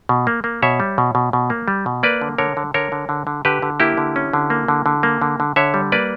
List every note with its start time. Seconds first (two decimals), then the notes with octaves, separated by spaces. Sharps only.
0.09 B2
0.27 A#3
0.44 A#3
0.62 B2 C#5 E5
0.80 G3
0.98 B2
1.15 B2
1.33 B2
1.50 A#3
1.68 G3
1.86 B2
2.03 A#3 B4 D5
2.21 D3
2.38 D3 A#4 C#5
2.57 D3
2.74 D3 A#4 C#5
2.92 D3
3.09 D3
3.27 D3
3.45 D3 G4 B4
3.62 D3
3.80 A#3 E4 G4
3.98 D3
4.16 C#4
4.33 D3
4.50 A#3
4.68 D3
4.86 D3
5.03 A#3
5.22 D3
5.40 D3
5.56 D3 C#5 E5
5.74 G3
5.92 A#3 B4 D5